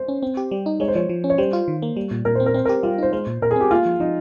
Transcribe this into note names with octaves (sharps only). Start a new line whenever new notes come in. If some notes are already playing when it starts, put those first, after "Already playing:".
Already playing: C5
C#4
C4
G4
G3
D#4
G#3 C#5
C5
F3 C#5
F3
C#4
C#5
G3 C5
F4
D#3
A#3
G3
A#2
A#2 A#4
C4 C5
A#4
C4 C5
G4 A#4
G3 F4
D#4 C5
G#3 C5
A#2
A#2 A#4
G#4
C4 G4
A#3 F4
F3
F3 D#4